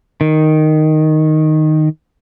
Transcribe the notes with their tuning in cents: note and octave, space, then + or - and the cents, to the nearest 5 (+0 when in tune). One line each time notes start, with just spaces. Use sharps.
D#3 -5